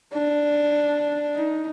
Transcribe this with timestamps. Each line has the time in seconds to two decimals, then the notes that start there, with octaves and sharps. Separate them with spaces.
0.14 D4
1.35 D#4